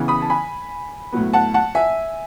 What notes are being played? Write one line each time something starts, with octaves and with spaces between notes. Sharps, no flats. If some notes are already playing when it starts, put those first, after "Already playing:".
Already playing: C#3 E3 B3
B5 D#6
A5
G#5 B5
A2 F#3 B3
F#5 A5
F#5 A5
E5 G#5